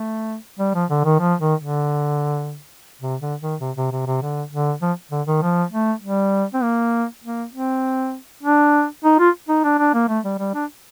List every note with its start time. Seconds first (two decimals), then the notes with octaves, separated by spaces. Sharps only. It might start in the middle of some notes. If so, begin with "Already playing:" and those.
Already playing: A3
0.59 G3
0.74 F3
0.90 D3
1.04 D#3
1.20 F3
1.40 D#3
1.60 D3
3.01 C3
3.20 D3
3.41 D#3
3.61 C3
3.77 C3
3.91 C3
4.07 C3
4.22 D3
4.52 D3
4.81 F3
5.11 D3
5.27 D#3
5.42 F3
5.71 A3
6.02 G3
6.54 C4
6.63 A#3
7.23 A#3
7.53 C4
8.43 D4
9.04 D#4
9.19 F4
9.49 D#4
9.64 D4
9.79 D4
9.94 A#3
10.09 A3
10.24 G3
10.39 G3
10.54 D4